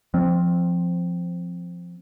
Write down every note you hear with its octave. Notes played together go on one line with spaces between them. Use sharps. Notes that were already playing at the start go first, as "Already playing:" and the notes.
F3 C4